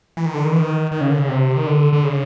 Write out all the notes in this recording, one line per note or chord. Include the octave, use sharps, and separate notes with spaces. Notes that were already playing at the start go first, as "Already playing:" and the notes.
E3
D#3
D3
D#3
E3
D#3
D#3
C#3
D3
C#3
C3
D#3
D3
D3
C#3